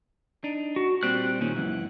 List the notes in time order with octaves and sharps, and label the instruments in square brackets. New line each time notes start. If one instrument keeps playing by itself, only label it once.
[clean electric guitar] D4 D#4
[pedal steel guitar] F#4
[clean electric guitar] A#2 G3 C4 [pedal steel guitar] F#6
[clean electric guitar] A#2 D#3 C#4
C#2 F#2 E3